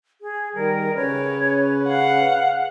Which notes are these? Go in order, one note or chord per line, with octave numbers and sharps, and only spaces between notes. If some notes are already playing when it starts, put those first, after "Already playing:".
G#4
D#3 G3 A#4
C#3 C#4 B4 C#5
F5 F#5